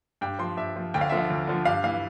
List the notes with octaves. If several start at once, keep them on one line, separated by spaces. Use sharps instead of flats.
G2 G5
F3 C6
G2 E5
F3
D2 G5
F5
D3 F3 E5
F5
D2
D3 F3
G2 F5
E3 F5